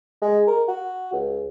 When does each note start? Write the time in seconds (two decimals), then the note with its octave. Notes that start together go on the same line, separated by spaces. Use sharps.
0.22 G#3
0.47 A#4
0.68 F#4
1.13 C#2